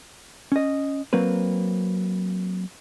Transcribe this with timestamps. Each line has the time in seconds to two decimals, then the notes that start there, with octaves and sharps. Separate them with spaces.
0.52 C#4 D#5
1.13 F#3 A#3 C4 B4